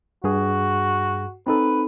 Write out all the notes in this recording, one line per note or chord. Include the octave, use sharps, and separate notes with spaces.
G2 F#4 G#4
C4 D#4 A4 B4